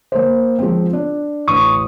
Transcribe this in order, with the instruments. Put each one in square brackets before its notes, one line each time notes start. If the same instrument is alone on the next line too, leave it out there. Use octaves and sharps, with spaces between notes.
[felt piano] A#3 C5
F3 G#3 C4
D4
[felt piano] A1 [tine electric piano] C#6 D#6